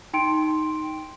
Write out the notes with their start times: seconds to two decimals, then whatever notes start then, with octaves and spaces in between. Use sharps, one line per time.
0.13 D#4 G5 C6 D7